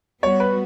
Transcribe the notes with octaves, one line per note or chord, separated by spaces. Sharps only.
G3 B3 F#4 C#5
B4